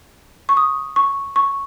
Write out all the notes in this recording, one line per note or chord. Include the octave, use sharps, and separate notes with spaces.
C#6
D#6
C#6
C#6